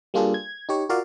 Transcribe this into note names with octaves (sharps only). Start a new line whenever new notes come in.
G3 A#3 D4 F4 G#4 A4
G#6
D#4 G4 C#5
F4 F#4 A#4 D5 F5